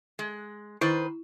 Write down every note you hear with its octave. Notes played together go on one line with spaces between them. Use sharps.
G#3
D#3 E4 B4 C5